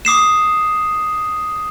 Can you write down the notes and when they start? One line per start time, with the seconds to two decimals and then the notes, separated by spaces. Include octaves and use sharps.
0.05 D6 D#6 C7 E7